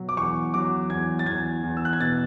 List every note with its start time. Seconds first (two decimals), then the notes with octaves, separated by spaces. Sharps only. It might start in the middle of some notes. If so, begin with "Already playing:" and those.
Already playing: B2 F#3
0.09 D6
0.17 E2 C#6
0.54 F#3 D6
0.90 E2 G#6
1.19 A6
1.26 E2 G#6
1.63 E2
1.77 E6
1.85 F#6
1.93 G#6
2.00 B2 A6